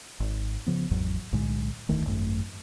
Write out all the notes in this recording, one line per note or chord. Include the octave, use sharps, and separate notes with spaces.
G#1
C#3 F3 B3
G#1 E2 G#2 F#3
B1 A2 D3 G#3
E1 D2 D#3 A3
G#1 F#2 A3